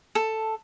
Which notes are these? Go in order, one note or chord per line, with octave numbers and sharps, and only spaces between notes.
A4